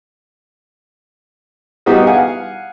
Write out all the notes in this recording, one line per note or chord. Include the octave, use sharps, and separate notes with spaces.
G3 B3 D#4 E4 F#4 G#4
F5 F#5 G#5